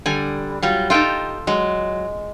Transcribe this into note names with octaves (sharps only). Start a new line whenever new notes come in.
D3 G3 G#5
F#3 G3 F4
D#4 F4 G4 A4 G5
F#3 G#3